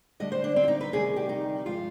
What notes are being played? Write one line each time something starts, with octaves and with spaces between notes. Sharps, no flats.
D2 D3 G3 D#5
C5
D4
C4
F4
D#4
B4
D2 C3 D#3 G3 G#4
G4
D#4
G2 F3 G#3 F4